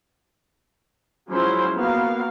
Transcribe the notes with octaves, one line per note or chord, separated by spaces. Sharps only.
F3 F#3 G#3 C#4 E4 C5
A#3 B3 F#4 A#4 F5